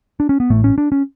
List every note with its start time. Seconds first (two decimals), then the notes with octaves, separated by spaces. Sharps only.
0.20 D4
0.29 C#4
0.40 B3
0.50 A1 A2 A3
0.64 C#4
0.78 D4
0.92 C#4